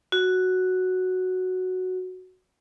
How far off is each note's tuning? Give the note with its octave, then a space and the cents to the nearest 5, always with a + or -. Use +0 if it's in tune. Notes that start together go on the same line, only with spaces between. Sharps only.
F#4 +0